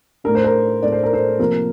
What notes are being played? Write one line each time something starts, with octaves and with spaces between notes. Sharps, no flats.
A2 A3 D4 A#4
C5
A#4
A2 A3 D4 D5
C5
A#4
A4 C5
C3 F3 A#3 A#4